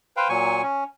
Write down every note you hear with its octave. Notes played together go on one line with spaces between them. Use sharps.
B4 C5 F5 G5
A#2 F#3 G#5 C#6
C#4